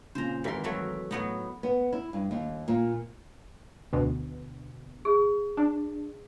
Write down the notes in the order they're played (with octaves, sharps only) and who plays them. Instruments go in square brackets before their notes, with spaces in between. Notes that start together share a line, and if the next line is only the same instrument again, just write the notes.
[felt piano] A#2 C#3 [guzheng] C5 A#5
[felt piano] G#1 A#4 B6 [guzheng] E3 C6
[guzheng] E3 F#3 A3
[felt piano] A2 [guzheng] F#3 B3 D#4
[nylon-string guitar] B3
E4
G2
D#2
A#2
[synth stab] D2 B2
[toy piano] G#4
[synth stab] D4